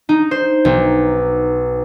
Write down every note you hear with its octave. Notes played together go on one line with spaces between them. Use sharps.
D#4
C5
B1